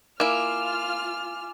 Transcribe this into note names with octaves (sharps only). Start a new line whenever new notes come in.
A#3 E4 F4 G#5 D6 F6 E7